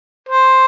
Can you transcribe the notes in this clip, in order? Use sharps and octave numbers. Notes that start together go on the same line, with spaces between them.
C5